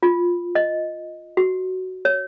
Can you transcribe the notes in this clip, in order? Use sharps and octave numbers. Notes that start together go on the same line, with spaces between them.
F4
D#5
F#4
C#5